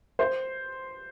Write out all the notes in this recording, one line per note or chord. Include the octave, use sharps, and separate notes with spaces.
C5